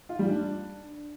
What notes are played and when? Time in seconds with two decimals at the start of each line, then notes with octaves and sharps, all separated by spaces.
0.09 F4
0.19 G3
0.29 D4